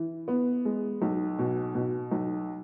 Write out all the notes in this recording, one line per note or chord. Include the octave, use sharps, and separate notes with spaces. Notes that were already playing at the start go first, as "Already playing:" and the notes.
Already playing: E3
B3
G#3
B1
B2
B2
B1